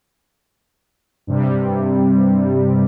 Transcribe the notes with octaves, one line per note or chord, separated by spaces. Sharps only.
G2 C3 G3